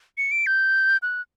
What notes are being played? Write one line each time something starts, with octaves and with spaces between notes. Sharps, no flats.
C#7
D7
G6
F#6